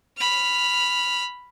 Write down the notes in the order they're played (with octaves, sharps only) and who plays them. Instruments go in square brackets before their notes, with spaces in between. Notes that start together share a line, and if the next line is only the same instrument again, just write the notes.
[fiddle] B5 F6